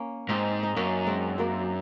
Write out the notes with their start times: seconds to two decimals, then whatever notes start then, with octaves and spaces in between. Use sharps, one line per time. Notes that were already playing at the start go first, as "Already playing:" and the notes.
Already playing: A#3 C#4
0.29 G#2 C4 D#4
0.63 D#4
0.76 F#2 A#3 C#4
1.07 G#3 C4
1.38 F#3 A#3